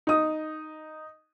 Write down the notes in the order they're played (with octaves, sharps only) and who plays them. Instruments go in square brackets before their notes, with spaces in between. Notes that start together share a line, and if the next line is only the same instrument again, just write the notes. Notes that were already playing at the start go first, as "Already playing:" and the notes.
[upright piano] D#4 D#6